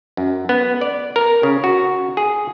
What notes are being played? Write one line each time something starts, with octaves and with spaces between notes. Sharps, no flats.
F#2
B3
D5
A#4
C#3
F#4
G#4